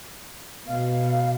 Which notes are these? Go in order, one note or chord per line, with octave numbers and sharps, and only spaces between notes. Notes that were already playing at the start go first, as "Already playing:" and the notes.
B2 F5